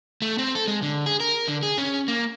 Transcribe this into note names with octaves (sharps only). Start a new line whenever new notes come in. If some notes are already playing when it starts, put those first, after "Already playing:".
A3
C4
A4
G#3
D3
G#4
A#4
D3
G#4
C#4
A#3